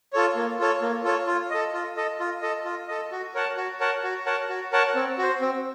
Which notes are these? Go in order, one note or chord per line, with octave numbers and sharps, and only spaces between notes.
F4 A4 C#5
A#3
F4 A4 C#5
A#3
F4 A4 C#5
F4
A4 D#5
F4
A4 D#5
F4
A4 D#5
F4
A4 D#5
F#4
A#4 C#5 F#5 A5
F#4
A#4 C#5 F#5 A5
F#4
A#4 C#5 F#5 A5
F#4
A#4 C#5 F#5 A5
C4
F#4 C5
C4